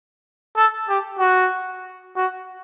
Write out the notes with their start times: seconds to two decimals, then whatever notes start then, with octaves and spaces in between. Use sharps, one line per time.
0.57 A4
0.89 G4
1.19 F#4
2.16 F#4